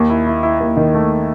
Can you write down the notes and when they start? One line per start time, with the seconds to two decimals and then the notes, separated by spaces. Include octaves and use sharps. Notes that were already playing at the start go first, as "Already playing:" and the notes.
Already playing: D#2
0.10 E4
0.26 E4
0.43 E4
0.60 D#2
0.77 D#3
0.94 A3